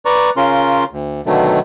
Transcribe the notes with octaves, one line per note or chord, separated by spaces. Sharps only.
B4 D5 A#5 C#6
C#3 C#4 F4 A#4 C6
D2
B2 D3 D#3 F#3 A3